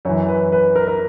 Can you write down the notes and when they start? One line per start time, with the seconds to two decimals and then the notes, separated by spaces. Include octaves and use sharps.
0.05 F#2 E3 C#5
0.29 B4
0.52 B4
0.76 A#4
0.88 A#4